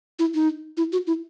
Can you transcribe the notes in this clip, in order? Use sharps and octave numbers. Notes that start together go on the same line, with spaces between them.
E4
D#4
E4
F#4
E4